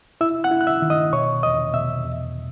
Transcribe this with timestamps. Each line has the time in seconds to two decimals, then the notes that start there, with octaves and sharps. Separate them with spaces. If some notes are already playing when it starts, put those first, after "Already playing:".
0.21 E4 E5 E6
0.44 F#5 F#6
0.51 E4
0.61 F#6
0.67 E5 E6
0.82 D#3
0.90 D#5 D#6
1.13 B2 C#5 C#6
1.43 E2 D#5 D#6
1.74 B2 E5 E6
2.04 E2